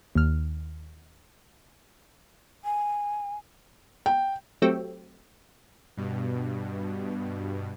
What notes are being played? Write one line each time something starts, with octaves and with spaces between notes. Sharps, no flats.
D#2 F6
G#5
G5
F#3 A3 C4 G4
G2 B2